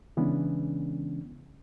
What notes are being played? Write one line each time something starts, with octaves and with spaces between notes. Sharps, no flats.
C#3 E3 G#3 B3 C#4 D4